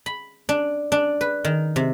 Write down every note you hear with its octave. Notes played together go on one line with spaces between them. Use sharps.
B5
D4
D4
B4
D#3
C3